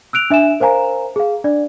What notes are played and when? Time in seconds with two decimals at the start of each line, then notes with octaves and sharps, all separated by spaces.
0.13 E6 F#6 D7 F7
0.30 D4 E5 G#5 E7
0.60 A#4 C5 F5 G#5 A#5
1.16 G#4 F5
1.44 D4 D5